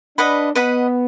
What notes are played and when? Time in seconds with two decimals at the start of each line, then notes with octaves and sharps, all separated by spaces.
0.18 D4 B4 D#5 F#5 B5
0.55 B3 B4 D#5 F#5 B5